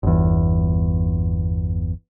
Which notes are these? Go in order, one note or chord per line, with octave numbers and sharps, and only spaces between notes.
G1 E2